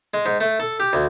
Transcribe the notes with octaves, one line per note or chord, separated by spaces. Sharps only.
G#3
G#2
A3
A4
G4
D2